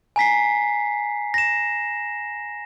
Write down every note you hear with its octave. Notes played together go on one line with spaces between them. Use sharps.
G#5 A#5 B6 C7
A#6 E7